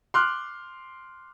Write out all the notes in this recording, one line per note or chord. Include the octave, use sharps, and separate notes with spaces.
C6 D6 F6 F#6